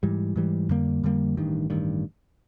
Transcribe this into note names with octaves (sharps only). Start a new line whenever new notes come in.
G#2 E3 G3
G#2 E3 G3
F2 D3 G3 A#3
F2 D3 G3 A#3
A1 G2 D#3
A1 G2 D#3